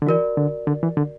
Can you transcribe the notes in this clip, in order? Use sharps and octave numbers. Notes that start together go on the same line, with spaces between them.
D3
E3 F#4 A#4 D5
D3
D3
E3
D3